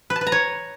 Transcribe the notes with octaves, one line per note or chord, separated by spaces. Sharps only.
B4
A5
B4
A#5
C#5